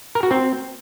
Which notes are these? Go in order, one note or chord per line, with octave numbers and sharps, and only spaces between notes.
A#4
F#4
C4